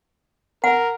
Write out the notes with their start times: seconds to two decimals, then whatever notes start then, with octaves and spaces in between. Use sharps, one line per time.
0.64 A#4 F#5